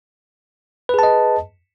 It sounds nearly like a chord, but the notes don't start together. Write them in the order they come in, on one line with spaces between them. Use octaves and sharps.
B4 G#4 A5 D#5